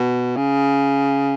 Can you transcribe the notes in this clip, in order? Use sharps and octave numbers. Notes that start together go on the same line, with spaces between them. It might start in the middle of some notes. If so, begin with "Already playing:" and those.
Already playing: B2
C#3